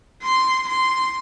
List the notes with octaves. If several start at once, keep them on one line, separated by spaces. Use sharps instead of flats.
C6
C6